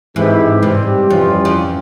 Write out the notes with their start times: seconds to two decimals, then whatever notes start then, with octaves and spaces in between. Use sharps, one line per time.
0.16 G#2 E3 G#3 C4 E4 G4
0.62 G2 C3 G3 C4
1.10 F2 E3 G3 C#4 F4
1.45 F2